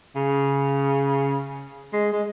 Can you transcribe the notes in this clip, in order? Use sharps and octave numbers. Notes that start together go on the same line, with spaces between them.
C#3
G#3
G#3